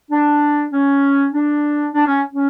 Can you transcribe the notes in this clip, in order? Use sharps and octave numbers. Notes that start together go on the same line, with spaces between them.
D4
C#4
D4
D4
C#4
C#4